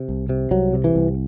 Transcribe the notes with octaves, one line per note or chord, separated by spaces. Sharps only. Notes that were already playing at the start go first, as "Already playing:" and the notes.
Already playing: C3
C2
C3
C2 F#3
C3
E3
C2